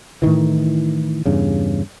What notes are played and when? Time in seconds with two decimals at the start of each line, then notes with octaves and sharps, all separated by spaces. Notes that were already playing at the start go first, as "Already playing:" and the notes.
0.22 A2 C3 D#3 E3
1.26 E2 G2 C#3